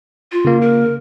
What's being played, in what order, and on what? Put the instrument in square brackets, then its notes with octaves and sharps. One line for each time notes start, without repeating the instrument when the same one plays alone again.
[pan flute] F4
[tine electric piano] C#3 A#3
[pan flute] A#4